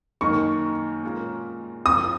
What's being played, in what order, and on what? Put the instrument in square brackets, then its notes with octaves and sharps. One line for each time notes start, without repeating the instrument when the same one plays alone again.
[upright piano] F#2 D#3 A#3 D#4 A#4 [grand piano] C#6
[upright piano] A#2 G#3 C#4 F4 A#4
[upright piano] F3 C4 F4 [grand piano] D#6